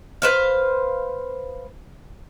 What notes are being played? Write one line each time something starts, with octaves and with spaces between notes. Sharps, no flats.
B4 C5 F5